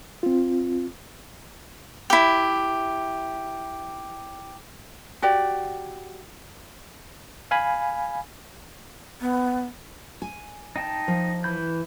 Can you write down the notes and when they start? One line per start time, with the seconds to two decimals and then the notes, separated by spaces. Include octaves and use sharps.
0.23 C4 F4
2.10 E4 G4
5.22 F#4 G4 D5
7.51 F5 G#5 B5
9.21 B3
10.22 G#5
10.76 D#4 G5 A5
11.08 F3
11.44 E3 B5 G6